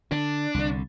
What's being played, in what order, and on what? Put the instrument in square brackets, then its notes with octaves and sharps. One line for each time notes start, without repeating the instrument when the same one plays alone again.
[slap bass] D3 [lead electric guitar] D4
[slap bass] C2 D3